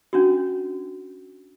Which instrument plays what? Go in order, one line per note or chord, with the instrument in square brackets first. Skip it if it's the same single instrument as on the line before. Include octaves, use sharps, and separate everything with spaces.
[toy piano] C#4 D4 F#4